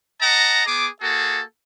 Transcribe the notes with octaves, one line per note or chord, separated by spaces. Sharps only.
D#5 F#5 A5 A#5
B3 G#4 D6
A#3 F#4 G#4 A4